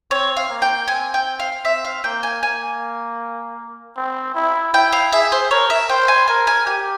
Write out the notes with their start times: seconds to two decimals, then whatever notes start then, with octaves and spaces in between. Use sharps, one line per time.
0.11 C4 C#5
0.37 F5
0.49 A#3
0.62 G5
0.88 C4 G#5
1.14 G5
1.40 F5
1.65 C4 E5
1.85 F5
2.04 A#3 G5
2.23 G#5
2.42 A#3 G#5
3.97 C4
4.35 E4
4.73 E4 G5
4.92 F5
5.12 G#4 E5
5.32 C5
5.51 A#4 C#5
5.70 E5
5.89 C5 G5
6.08 G#5
6.28 A#4 G#5
6.47 G#5
6.66 G4 G#5